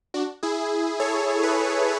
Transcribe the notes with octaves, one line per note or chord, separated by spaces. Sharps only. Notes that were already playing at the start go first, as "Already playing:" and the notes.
D4 F#4
E4 G#4
A4 C#5
G#4 B4